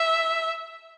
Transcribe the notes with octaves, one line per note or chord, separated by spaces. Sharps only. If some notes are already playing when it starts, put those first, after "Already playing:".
Already playing: E5